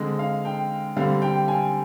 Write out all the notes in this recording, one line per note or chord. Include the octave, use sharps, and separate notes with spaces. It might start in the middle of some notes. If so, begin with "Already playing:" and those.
Already playing: D3 G#3 C4 D#5
F5
G5
D3 G3 C4 F5
G5
G#5